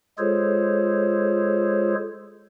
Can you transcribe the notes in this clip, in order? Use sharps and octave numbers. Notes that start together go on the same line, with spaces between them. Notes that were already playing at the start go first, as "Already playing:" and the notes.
G#3 F4 G#4 A4 C5 C#5